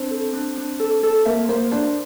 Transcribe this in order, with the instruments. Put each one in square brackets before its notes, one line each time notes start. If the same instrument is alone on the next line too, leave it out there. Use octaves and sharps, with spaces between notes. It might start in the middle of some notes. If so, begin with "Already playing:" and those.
Already playing: [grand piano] C4 [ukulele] D4
[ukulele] A4
D4
D4
A4
A4
[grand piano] A#3 [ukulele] E5
[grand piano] A#3 [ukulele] C5
[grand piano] D4 [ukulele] C5